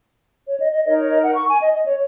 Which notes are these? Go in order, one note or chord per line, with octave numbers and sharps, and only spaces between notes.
C#5
D#5
D#5
D#4 A#4 C#5 D#5
C#5
D#5
F#5
C#6
G#5
D#5
D#5
C#5